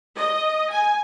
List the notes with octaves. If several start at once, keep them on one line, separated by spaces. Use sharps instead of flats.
D#5
G#5